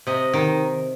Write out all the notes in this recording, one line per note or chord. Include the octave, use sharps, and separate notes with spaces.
C3 D#5
D#3